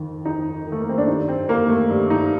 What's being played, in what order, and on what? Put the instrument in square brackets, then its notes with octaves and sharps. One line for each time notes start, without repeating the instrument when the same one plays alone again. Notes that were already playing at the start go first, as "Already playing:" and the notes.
Already playing: [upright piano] F2 D#3
F2 D#4
D#3
A3
A#3
C4
D4
G2 D#4
C4
D#3 A#3
A3
G2
D#4